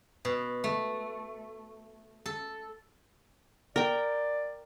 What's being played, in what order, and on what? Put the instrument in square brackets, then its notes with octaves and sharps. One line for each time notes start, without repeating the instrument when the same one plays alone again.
[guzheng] B2
A3
A4
[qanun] A#4 G5 [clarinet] D5